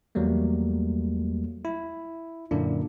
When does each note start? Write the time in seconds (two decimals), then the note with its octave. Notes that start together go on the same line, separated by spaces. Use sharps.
0.15 E2 F#3 G3 A3 A#3
1.65 E4
2.51 F#2 A#2 D3 A#3 D4 E4